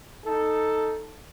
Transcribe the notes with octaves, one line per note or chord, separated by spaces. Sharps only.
D#4 A4